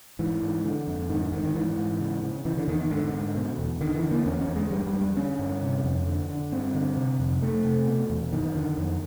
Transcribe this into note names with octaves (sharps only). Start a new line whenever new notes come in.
G#2 E3
G#2
D3
F2
G#2 D#3
D3
G#2 D#3
D#3
G#2 E3
G#2
C#3
C#3
C#3 E3
D3
E2 D#3
D#3
G#2 D3
G#2
B2
E2
D3 D#3
E3
D3
A#3
E2 C#4
C#4
E2
G#3
G2 G3
G3
G2
G3
D3 C#4
G2
C3
F2
D3
D3
G2 C4
D3
C3
F2
F2 A3
C3
B2
E2
F#2 D#3
D3
F2